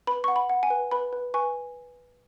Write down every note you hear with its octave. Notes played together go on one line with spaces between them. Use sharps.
B4 B5
F#5 C#6
B5
F#5
G#5
B4
B4 B5
B4
B4 G#5 C#6